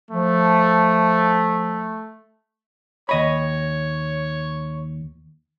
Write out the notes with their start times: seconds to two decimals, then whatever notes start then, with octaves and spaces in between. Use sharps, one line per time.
0.11 F3 A3
3.09 D#2 C#5 D#5 B5